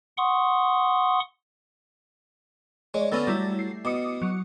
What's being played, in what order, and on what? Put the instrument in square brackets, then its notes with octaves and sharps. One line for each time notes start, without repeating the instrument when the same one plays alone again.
[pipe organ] F#5 C6 C#6 D#6
[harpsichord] G#3 [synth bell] C#5 D5
[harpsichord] D3 B3 C#4 [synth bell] E6 A6 A#6
[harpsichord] F#3 [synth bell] G3 A3 E4
[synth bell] C7
[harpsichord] B2 [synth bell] D6 D#6 C#7
[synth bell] F#3 C#7